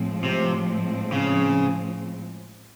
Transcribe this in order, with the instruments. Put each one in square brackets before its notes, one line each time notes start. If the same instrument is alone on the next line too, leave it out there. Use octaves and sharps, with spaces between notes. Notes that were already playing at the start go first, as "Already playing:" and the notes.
Already playing: [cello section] A2 F3 G#3 C4
[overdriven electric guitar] C3
C#3